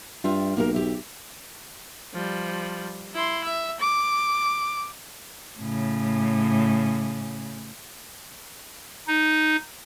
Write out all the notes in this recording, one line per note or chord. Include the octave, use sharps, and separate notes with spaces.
G2 F4 E5 G5
B1 A#3 G4 A#4
G4 E5
F3 G3
E4 C6
E5
D6
A2 C#3
D#4